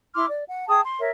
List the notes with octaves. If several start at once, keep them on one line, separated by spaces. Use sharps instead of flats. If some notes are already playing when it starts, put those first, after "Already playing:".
E4 C6 D6 F6
D5
F#5
G#4 G5 A5 D#6
C6
A#4 C#5 E5